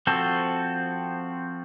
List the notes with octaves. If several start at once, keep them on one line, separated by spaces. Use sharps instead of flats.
F3 C4 F#4 A4